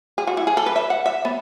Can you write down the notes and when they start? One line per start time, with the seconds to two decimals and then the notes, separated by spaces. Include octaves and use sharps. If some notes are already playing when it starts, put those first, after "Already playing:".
0.18 G#4
0.27 F#4
0.37 E4
0.47 G#4
0.57 A4
0.66 B4
0.76 E5
0.90 F#5
1.06 E5
1.25 B3